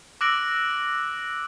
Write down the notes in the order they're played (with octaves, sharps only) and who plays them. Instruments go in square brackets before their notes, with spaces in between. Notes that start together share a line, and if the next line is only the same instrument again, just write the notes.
[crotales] D6 E6 F#6 A#6 D7 F#7